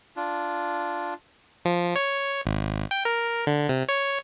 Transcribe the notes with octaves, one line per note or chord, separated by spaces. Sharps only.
D4 F4
F3
C#5
G#1
G5
A#4
D3
C3
C#5